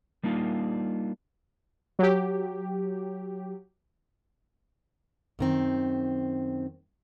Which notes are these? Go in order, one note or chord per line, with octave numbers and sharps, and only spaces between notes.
G3 A#3 D4 D#4 F4
F#3 G4
F#2 D#3 C4